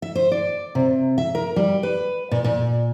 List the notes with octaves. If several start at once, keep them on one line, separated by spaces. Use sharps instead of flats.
E5
C5
D5
C3
E5
A#4
G3
B4
A#2
A#2